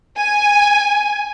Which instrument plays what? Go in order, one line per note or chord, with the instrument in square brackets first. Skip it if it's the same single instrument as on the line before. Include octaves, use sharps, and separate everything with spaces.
[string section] G#5